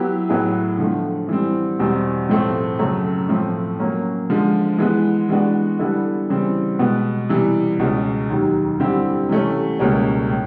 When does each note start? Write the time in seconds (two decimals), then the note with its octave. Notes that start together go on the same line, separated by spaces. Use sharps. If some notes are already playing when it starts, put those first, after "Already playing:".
Already playing: F#3 B3 E4 G4
0.29 A2 F#3 B3 E4 G#4
0.78 D3 F3 A3
1.29 E3 G3 C4
1.79 E2 B2 G3 C4
2.29 A2 F3 A3 C4
2.79 F#2 C#3 F#3 A3
3.28 A2 F3 A3 C4
3.80 F#3 A#3 C#4
4.30 D3 F3 G#3
4.79 E3 G#3 B3
5.29 E3 G#3 B3 D4 F#4
5.79 D3 G3 B3 E4 A4
6.29 C#3 E3 G3 C4
6.79 B2 G#3 B3
7.29 C3 E3 G3
7.79 C#2 B2 G#3 C#4
8.30 D#2 D#3 F#3
8.80 D3 G3 C4 E4 G4
9.29 C3 E3 A3 C#4
9.79 C#2 B2 G3 A#3 C#4
10.29 A2